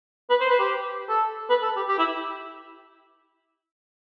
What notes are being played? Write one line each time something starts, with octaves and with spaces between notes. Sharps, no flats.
B4
C5
B4
G4
A4
B4
A4
G4
G4
E4